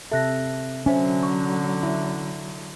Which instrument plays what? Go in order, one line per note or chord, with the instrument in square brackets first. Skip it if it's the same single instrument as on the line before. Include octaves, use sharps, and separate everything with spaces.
[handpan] C3 A4 [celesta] E5 F#6 A#6
[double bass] D3 F#3 [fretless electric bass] C#4 [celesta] C5 E5 G#5
[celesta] C#6
[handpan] E4